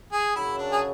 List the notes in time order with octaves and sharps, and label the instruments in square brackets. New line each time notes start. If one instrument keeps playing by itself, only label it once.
[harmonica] G#4
[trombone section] F#2 C#3 F#3 [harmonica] E4
[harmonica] D4
G#4